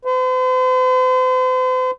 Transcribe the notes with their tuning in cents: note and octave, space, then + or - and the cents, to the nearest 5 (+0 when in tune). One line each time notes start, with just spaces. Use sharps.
C5 -45